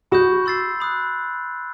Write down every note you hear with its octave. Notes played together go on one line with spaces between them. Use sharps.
F#4 B5 D#6 G6
C6 E6 A6 C7
B5 D#6 F#6